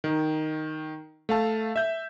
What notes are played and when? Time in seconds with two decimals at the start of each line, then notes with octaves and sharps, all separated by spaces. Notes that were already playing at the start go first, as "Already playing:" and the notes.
0.04 D#3
1.29 A3 F5 A5
1.76 E5 G6